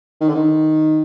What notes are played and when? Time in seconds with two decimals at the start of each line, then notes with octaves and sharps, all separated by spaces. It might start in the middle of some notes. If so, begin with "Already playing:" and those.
0.21 D#3
0.29 D3
0.35 D#3